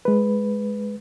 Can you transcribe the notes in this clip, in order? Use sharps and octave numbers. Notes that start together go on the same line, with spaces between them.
G#3 B4